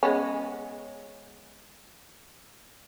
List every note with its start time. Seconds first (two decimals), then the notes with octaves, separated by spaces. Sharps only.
0.03 G#3 B3 C#4